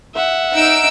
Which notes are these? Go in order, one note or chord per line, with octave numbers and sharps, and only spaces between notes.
E5 F#5
D#4 E6 D7